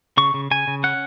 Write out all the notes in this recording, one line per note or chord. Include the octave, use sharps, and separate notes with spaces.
C#3 C#6
C#3
C#3 G#5
C#3
C#4 F#5